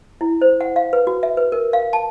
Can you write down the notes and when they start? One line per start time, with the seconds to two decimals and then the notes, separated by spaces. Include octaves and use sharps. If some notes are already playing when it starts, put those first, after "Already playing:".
0.21 E4
0.41 C5
0.61 F#5
0.76 F5
0.93 B4
1.07 F#4
1.23 E5
1.37 B4
1.52 A#4
1.73 F5
1.93 A5